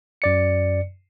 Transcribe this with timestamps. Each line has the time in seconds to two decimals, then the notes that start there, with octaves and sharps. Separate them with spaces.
0.22 F#2 D5 C#7